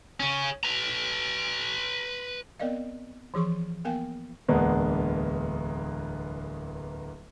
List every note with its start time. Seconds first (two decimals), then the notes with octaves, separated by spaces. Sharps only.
0.20 C#3 C#4
0.63 B4 A#5
2.60 B3 C4 A#4 D5 D#5 F5
3.34 E3 F3 G#4 C6 C#6
3.85 A#3 B3 A#4 F5 G5 G#5
4.48 D1 E2 G#3 A#3 B3 D4